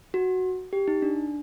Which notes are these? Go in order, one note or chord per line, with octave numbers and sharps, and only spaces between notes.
F#4
G4
D#4
D4